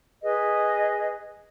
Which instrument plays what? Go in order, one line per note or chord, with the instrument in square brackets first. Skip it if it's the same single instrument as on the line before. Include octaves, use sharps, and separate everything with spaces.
[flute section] G#4 B4 D#5